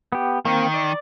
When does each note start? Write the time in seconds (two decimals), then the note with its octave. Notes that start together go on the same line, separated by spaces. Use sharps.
0.12 B3 G4
0.45 D#3 A#3 C4
0.74 D5